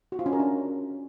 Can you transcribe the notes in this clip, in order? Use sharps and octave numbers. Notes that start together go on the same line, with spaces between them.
F#4
F4
C#4
A#4
D4